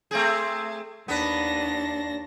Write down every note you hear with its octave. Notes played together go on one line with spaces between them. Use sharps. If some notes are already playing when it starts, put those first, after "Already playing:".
A3 C4 G#4
D#2 B3 D4 B4 A#6